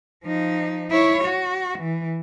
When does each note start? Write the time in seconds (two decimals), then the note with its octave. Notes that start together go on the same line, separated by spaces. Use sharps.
0.24 F3 D#4
0.90 E4 C#5
1.25 F#4
1.79 E3